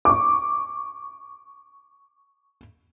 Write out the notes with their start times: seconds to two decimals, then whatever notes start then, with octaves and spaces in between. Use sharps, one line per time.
0.05 C#6 D6